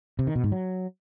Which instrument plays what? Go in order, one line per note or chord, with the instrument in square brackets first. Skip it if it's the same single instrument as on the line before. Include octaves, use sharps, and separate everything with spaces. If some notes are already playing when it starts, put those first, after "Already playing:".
[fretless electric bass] C3
D#3
B2
G#2
F#3